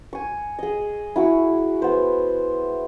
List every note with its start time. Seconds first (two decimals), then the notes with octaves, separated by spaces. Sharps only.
0.13 G#5 C#6
0.59 G#4 D#5
1.16 E4 F#4 C#6
1.82 B3 C5